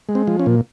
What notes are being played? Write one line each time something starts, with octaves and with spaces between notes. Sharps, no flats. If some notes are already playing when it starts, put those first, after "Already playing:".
G#3
C4
F3
C#4
A#2